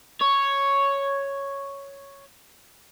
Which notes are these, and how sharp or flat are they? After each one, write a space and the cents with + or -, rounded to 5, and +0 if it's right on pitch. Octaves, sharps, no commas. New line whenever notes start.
C#5 +0